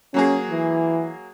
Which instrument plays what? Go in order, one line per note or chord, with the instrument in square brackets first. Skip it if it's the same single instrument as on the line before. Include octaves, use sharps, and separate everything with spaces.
[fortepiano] F#3 A#3 G#4 [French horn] C#4
[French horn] E3